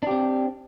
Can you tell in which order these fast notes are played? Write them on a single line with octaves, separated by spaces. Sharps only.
D4 G4 C4